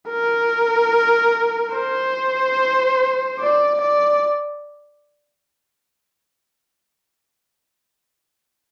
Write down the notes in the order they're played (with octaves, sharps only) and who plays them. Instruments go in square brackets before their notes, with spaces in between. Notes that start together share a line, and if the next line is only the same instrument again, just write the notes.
[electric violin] A#4
C5
D5
D5